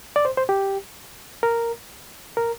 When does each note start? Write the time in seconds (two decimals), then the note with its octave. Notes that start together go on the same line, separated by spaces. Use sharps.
0.16 D5
0.25 C5
0.37 C5
0.49 G4
1.43 A#4
2.37 A#4